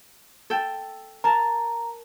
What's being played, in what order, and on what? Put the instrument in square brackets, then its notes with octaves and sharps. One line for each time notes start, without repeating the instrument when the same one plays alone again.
[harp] A4 G5
[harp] A#4 A5 [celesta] A#5